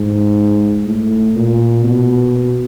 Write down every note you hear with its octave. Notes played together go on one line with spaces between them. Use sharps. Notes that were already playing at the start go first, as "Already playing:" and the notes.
Already playing: G#2
A2
A#2
B2